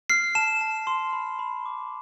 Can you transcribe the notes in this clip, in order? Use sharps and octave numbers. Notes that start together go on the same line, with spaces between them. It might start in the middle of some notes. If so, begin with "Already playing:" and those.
F6 C7
A5 E7
A5
C6
B5
B5
D6